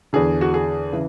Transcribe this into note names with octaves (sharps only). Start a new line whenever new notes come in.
E2 D3 G#4
F#4
G#4
C#3 E3